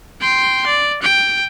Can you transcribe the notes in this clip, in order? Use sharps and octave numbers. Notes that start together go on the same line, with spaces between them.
G5 C6
D5
G5